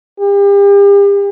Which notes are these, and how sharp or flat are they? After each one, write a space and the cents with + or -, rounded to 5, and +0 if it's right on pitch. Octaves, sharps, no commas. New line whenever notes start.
G4 +40